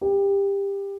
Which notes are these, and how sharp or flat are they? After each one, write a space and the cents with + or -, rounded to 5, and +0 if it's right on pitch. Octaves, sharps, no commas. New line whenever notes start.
G4 +20